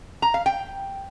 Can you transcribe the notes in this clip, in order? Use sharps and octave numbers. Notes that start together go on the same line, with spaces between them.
A#5
F5
G5